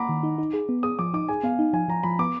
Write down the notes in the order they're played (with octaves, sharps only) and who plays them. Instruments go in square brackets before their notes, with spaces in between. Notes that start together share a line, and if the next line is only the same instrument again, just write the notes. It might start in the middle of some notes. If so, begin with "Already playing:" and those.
Already playing: [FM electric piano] A#3 [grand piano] F#5 A#5 B5 D6
[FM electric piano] D#3
D#4
D#4
G#4
B3
[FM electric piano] G#4 [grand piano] D#6
[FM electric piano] F3 [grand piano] D6
[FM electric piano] D#4 [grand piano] D6
[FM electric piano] G#4 [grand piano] G#5
[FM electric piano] B3 [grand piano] F5
[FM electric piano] D#4
[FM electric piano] F3 [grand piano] G#5
[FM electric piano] F3 [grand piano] A#5
[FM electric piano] F3 [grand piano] B5
[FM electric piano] B3 [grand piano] D6